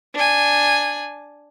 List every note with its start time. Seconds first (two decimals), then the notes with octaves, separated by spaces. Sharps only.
0.15 D4 G#5